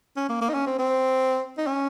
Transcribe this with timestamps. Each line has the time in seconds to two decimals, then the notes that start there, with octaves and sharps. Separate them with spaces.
0.17 C#4
0.29 A#3
0.42 A#3
0.49 D#4
0.54 C#4
0.67 C4
0.79 C4
1.58 D#4
1.67 C#4